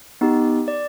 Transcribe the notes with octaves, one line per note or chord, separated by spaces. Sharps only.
B3 D#4 G4
D5